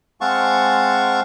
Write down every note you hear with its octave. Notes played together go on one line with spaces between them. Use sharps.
G#3 C4 F5 F#5 A5 C#6